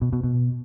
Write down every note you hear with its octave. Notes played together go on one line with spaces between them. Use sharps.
B2
B2
B2